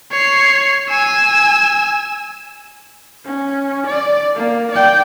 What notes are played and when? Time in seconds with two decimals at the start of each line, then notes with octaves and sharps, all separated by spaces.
0.12 C#5 C7
0.90 G#5 E6
3.25 C#4
3.87 D5
4.35 A#3
4.72 D5 G5